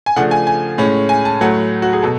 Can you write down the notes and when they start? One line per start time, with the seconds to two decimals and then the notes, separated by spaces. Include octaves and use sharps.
0.06 G#5
0.16 C#3 F3 A3 D4 F#5
0.31 G#5
0.47 G#5
0.78 A2 G#3 C#4
1.09 G#5
1.25 A5
1.41 A2 F#3 A3 F#5
1.82 F#4
1.93 G#4
2.02 B2 A4